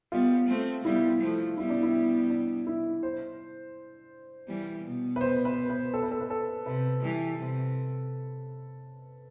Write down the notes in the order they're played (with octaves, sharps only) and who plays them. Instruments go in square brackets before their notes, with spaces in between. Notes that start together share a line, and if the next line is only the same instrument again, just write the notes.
[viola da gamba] G3 B3 [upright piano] F4
[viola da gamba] A3 C4
[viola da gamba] G3 B3 [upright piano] E4
[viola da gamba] F3 A3
[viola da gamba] G3 B3 [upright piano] E4
[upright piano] D4
E4
D4
E4
C5
[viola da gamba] E3 G3
B2
[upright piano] B4
C5
B4
B4
A4
B4
A4
B4
A4
[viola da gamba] C3 [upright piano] B4
[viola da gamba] E3 G3
C3